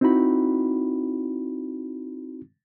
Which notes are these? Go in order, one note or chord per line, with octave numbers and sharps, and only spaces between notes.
C4 D#4 E4 F#4 B5